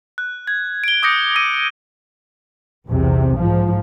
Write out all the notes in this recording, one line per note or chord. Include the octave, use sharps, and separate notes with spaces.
F#6
G#6
D7 G7
D6 D#6 G6 A#6 C#7
D#6 E6 A#6 D#7
B1 E2 C3
G#2 F3